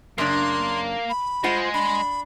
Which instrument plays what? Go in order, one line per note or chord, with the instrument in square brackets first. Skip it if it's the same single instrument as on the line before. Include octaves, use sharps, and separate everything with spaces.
[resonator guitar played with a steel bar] F#2 C#3 D4 [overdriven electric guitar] A#3 [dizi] C6
[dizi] B5
[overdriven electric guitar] G#3 [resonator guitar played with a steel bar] F4 C5 F#5
[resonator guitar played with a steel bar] D4 [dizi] B5